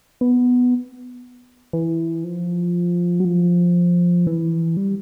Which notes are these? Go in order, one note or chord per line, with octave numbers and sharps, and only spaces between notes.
B3
E3
F3
F#3
F3
E3
G3